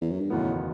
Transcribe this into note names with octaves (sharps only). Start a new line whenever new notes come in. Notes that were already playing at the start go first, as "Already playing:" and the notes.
E2
F#2
G2
F#1 E2 A2 D#3 F#3 B3